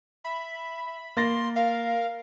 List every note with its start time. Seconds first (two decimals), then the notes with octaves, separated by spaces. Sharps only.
0.24 E5 B5
1.17 A#3 C6 A6 A#6
1.56 A#4 F5